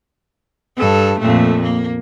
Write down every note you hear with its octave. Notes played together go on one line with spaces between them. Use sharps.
G2 A4
F2 A#2 A3
A#3